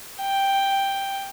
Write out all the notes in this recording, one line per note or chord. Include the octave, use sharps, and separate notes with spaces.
G5